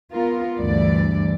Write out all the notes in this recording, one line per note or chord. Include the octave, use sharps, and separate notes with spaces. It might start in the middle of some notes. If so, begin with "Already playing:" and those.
B3 F4 A#4
D2 G2 E3 D5